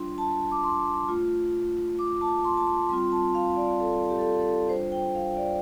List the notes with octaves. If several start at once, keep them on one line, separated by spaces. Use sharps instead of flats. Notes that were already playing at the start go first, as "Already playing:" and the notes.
Already playing: G3 D4 F4 C6
A5
D6
C6
A3 F4
D6
A5
C6
A5
C6
G3 C4 F4 C6
A5
F5
D5
A4
G4
A4
G4
A4
G3 D4 F4 C5
G5
F5
D5